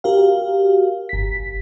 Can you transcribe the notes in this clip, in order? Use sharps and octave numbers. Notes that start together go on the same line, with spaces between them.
F#4 G4 A#4 F5
G1 B6